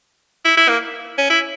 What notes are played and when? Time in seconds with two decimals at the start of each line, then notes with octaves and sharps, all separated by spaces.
0.45 E4
0.57 E4
0.69 A#3
1.18 C#4
1.30 E4